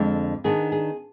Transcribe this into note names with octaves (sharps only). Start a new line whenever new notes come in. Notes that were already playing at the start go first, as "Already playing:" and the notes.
Already playing: F2 D3 G#3
D#3 B3 D4 G#4
G#4